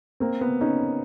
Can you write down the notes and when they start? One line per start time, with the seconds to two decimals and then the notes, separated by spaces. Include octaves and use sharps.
0.20 A#3 C4
0.41 B3
0.61 C#4 D#4